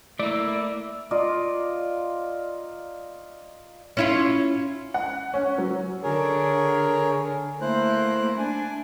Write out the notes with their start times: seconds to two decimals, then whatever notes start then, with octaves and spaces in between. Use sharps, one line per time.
0.20 A3 A#3 E4 D5 E6
1.11 F4 D5 D#5 A#5
3.97 C#4 E4 F4
4.94 F#5
5.34 C#4
5.58 F#3
6.03 D3 G#4 A#4 C#5
7.61 A3 A#3 E4 C5 F#6
8.38 D4 G#5